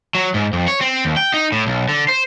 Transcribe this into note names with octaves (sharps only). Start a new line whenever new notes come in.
F#3
G#2
F2
C#5
C4
D#2
G5
D#4
A2
B1
D3
C5